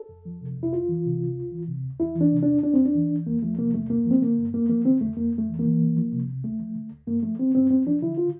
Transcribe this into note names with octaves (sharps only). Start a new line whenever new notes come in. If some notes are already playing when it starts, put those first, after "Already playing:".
Already playing: A4
F2
F3
C3
F2
E4
C2 F4
E3
C3
C2
D2
E3
C3
D2
E2 E4
E3
D4
C3
D4
E2
E2 D4
C4
E2
D4
E3
E3
E2 A#3
F3 A3
C3 A#3
E2 A3
G2 A#3
F3 C4
D3 A#3
G2
F2 A#3
F3 A#3
D3 C4
F2 A3
F2 A#3
F2
A3
E3
A#3
E3
C2
F3
C3
C2
D2 A3
F3
D3
D2
G2 A#3
F3 A3
D3 C4
G2 C4
E2 C4
F3 D4
D3 E4
F4